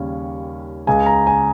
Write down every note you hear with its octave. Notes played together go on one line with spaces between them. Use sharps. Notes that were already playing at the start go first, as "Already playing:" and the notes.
Already playing: D#2 C#3 G3 C#4
C#2 C#3 G#3 G#5
A#5
G#5